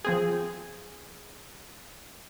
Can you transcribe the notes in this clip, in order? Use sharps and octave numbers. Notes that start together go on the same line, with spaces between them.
F3 C4 G#4